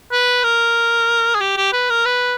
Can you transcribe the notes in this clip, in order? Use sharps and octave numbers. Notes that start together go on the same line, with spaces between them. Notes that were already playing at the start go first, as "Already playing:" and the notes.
B4
A#4
G#4
G4
G4
B4
A#4
B4